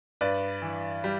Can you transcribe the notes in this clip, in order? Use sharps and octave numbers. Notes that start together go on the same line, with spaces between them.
G2 B4 D5
E3
G3